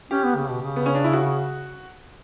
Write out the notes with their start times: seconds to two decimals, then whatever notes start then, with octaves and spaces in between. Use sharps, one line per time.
0.11 C#4 G4
0.24 B3
0.36 C#3
0.49 B2
0.62 C#3
0.76 B3
0.86 C#4
0.95 D4
1.04 E4
1.13 F#4